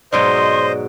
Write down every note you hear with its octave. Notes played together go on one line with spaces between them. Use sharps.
G#2 B2 F#3 C5 D5 D#5 C6